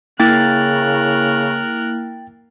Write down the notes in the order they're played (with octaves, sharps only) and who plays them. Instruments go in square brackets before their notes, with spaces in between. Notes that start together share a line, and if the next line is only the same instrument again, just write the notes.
[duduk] C#3 [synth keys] A#3 E4 [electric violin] A#4 F#6 [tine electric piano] G5 A6